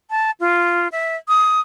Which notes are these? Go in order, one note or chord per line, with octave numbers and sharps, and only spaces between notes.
A5
F4
E5
D#6